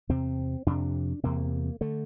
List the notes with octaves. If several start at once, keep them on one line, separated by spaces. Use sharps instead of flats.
E2 C3 C4
F2 C3 D4
E2 C3 A#3
D3 A3